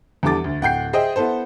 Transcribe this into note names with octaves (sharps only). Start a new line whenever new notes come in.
E2 D3 G3 A4 D6 A6
D2
D1 F#5 G5 G6 C7
G#4 C5 D#5 E5 G5
B3 E4 A4 C5